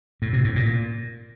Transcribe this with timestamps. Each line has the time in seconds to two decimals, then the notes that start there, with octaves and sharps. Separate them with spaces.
0.22 A2
0.33 C3
0.44 A2
0.56 A#2